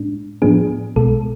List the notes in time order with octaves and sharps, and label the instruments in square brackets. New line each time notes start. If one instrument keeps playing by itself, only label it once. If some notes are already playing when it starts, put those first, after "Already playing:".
Already playing: [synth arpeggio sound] A2 G#3 D4
A2 F3 B3 D4 G#4
B1 B2 G#3 A4